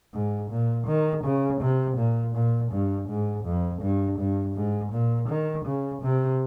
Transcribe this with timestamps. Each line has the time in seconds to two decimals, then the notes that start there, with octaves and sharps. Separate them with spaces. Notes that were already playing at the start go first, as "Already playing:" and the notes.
0.14 G#2
0.51 A#2
0.87 D#3
1.24 C#3
1.62 C3
1.98 A#2
2.35 A#2
2.72 G2
3.09 G#2
3.45 F2
3.82 G2
4.19 G2
4.56 G#2
4.93 A#2
5.29 D#3
5.66 C#3
6.03 C3